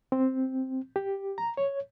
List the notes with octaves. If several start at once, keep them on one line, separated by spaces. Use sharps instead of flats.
C4
G4
A#5
C#5